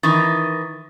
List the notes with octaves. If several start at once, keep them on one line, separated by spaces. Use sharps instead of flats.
D#3 E3 C#6 D#6 A6